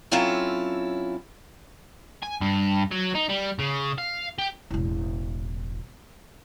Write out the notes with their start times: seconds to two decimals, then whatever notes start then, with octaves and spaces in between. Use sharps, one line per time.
0.11 F#3 C4 C#4 E4 F4 A4
2.23 G#5
2.41 G2
2.92 F#3
3.15 D#4
3.29 G3
3.60 C#3
3.98 F5
4.39 G4
4.70 E1 A1